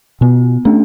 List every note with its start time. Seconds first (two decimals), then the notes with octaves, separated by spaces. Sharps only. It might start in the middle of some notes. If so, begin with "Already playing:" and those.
0.21 B2 B3
0.65 A3 C#4 D4